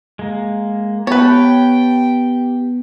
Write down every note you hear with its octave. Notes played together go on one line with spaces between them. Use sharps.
G#3 A#3
B3 G4 B4 C#5 G5 A5